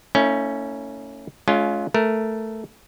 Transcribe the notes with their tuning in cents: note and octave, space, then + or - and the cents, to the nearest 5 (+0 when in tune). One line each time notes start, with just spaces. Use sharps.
A3 +40 C#4 +5 E4 -40
G#3 +35 C#4 +25 F4 +0
A3 +0 A#4 +0